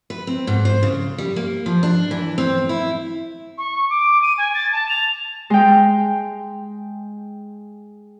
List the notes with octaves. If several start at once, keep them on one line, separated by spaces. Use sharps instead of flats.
B4
C4
G#2
C5
C#3
G3
A#3
F3
D4
E3
C4
E4
C#6
D6
D#7
G#5
A6
A5
F7
G#3 G5